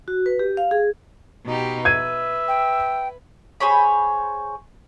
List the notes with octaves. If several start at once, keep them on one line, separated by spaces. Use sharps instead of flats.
F#4
B4
G4
F5
G#4
B2 D#4 G4
B4 E5 G#6 D#7
G5
G#4 C5 C#5 B5